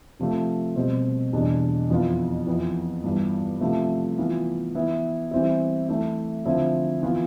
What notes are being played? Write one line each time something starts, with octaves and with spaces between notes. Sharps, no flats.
C3 F3 A3
B2 G3 C4
E2 B2 G3 D4
F2 E3 B3 F4
F2 E3 B3
G2 E3 B3
C3 F3 A3 E4
E3 B3 F4
E3 B3 E4
E3 G3 C4 E4
E3 A3 E4
D3 F3 C4 E4
E3 B3 F4